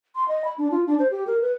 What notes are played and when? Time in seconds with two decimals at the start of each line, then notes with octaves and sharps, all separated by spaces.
0.15 C6
0.28 D#5
0.44 B5
0.58 D4
0.71 F4
0.87 D4
0.99 C5
1.11 G4
1.27 A#4
1.41 B4